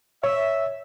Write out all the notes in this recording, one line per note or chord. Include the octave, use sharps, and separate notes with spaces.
C#5 E5